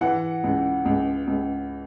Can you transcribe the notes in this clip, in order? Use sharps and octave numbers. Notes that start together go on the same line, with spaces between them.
E3 F#5
C#2
C#2
C#2